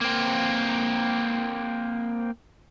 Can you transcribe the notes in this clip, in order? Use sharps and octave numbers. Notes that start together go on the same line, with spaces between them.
A#3 C4